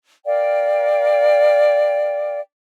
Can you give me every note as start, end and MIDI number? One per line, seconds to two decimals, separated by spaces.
0.26 2.40 70
0.26 2.40 74
0.26 2.40 77
0.26 2.40 79